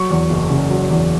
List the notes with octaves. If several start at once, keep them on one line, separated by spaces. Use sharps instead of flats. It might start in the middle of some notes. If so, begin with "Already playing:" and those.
Already playing: F#3 C#6
E2
F#1
C#3
F#3
E2